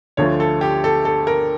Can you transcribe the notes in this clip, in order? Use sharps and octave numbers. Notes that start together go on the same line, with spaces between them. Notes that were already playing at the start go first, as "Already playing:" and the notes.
D2 D3 F3 A3 C#5
A4
G4
A4
A4
A#4